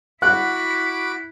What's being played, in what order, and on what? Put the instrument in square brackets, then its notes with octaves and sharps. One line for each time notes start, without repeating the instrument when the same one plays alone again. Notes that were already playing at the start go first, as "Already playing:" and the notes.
[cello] E4 [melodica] F#4 B5 D6 [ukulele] F#5 [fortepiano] F#6